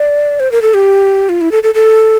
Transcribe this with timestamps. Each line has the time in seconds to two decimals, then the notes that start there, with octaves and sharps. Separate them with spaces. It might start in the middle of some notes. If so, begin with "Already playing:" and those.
Already playing: D5
0.40 C5
0.52 A#4
0.62 A4
0.74 G4
1.29 F4
1.41 E4
1.52 A4
1.63 A4
1.74 A4